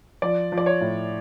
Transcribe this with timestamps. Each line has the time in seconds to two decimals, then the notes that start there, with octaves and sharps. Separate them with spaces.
0.22 F3 D5
0.52 F3
0.58 D5
0.66 C#5
0.81 A2